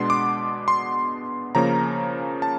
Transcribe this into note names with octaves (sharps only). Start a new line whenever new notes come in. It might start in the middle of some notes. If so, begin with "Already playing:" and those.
Already playing: B2 G#3 B3 D4 C6
D6
C6
C#3 F3 A#3 C#4 A#5
A5